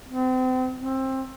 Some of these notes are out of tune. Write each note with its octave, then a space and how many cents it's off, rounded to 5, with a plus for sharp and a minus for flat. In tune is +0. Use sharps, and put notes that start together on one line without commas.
C4 -35
C4 +20